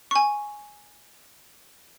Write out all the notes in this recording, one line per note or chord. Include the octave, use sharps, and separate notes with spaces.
G#5 C#6